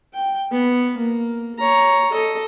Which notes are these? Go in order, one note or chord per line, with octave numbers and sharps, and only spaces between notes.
G5
B3
A#3
C#5 A#5
A4 D#5